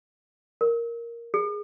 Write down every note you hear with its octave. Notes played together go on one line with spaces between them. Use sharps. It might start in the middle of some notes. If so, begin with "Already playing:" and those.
A#4
G#4